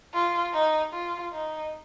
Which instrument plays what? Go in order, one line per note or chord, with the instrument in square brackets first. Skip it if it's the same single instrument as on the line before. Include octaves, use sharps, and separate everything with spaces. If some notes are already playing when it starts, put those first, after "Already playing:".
[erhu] F4
D#4
F4
D#4